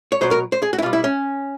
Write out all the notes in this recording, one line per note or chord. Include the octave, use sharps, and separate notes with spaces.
C#5
B2 F#3 C5
A#4
C5
G#4
F#4
E4
B2 G3 F4
E4
C#4